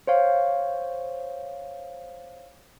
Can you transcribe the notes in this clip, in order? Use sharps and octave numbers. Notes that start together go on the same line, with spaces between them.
C5 C#5 F5